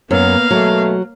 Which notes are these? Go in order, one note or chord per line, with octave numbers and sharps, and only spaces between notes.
F#2 A#3 B3 F5
B2 F#3 A3